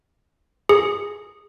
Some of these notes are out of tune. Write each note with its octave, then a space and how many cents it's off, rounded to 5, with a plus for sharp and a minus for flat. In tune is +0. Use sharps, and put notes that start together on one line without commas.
G#4 -10